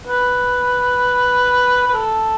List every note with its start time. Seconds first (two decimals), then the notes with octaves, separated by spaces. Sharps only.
0.07 B4
1.87 B4
1.94 A4